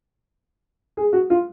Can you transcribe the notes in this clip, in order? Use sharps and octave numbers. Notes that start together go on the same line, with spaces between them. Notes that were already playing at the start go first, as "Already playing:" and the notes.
G#4
F#4
F4